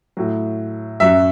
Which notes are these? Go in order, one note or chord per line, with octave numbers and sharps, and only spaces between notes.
A2 F#3
F#2 F#3 E5